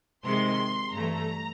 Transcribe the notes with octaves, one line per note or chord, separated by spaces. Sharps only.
C3 D#3 G#3 C6
G2 E3 A3 A#5